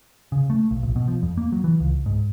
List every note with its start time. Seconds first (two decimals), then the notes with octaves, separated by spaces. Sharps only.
0.32 C#3
0.50 A3
0.71 B1
0.83 A#1
0.96 B2
1.08 F3
1.23 F2
1.37 A#3
1.52 F#3
1.64 E3
1.81 C#2
2.06 G#2